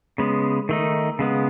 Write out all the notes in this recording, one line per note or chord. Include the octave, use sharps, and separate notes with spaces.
C#3 G#3 B3
D#3 A3 D#4
C#3 G#3 B3